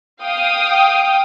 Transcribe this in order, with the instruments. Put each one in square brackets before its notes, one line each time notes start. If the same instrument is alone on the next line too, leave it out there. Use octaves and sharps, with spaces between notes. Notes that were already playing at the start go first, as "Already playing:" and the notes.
[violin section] F5 G5 D#6